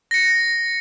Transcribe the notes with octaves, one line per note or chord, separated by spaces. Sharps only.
A#6 C#7